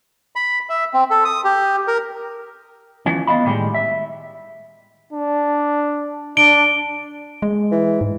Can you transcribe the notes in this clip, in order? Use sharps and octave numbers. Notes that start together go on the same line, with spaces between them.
B5
E5
C4
A4
D#6
G4
A#4
E3 F3 C#4
B3 D#5 F5 B5
A2 D#3 G3 G#3
E5
D4
D4 D7 G7
G#3
E3
G#2